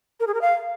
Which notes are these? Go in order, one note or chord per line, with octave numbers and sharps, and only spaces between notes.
A#4
G#4
A#4
F5